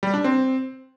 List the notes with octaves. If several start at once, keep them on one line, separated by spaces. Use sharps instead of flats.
G3
D4
C4